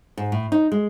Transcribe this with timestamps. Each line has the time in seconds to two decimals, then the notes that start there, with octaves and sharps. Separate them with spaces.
0.17 G#2
0.32 A2
0.52 D#4
0.72 G#3